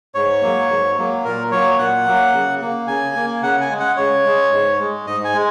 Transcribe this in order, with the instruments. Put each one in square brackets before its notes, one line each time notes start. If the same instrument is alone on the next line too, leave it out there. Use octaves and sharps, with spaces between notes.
[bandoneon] G#2 C#5
F#3 A#3
G#2
F#3 A#3
A#2 A#4
F#3 A#3 C#5
A#2 F#5
F#3 A#3
C#3
A#3
C#3 G#5
A#3
C#3 F#5
G#5
G#3
F#5
C#3 C#5
G#3
G#2
G#3
G#2 D#5
G#5
G#3